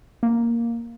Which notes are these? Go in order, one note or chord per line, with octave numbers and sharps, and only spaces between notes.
A#3